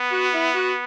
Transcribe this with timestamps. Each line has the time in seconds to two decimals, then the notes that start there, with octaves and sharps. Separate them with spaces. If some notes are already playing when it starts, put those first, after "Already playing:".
Already playing: B3
0.12 F#4
0.34 E4
0.55 F#4